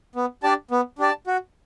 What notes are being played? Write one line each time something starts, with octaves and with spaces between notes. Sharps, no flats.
B3
D4 G4 D5 A5
B3
D4 G4 D5 A5
F#4